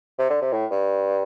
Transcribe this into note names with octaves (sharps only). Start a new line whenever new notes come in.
C3
D3
C3
A2
G2